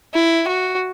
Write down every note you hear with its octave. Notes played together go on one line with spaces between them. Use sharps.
E4
F#4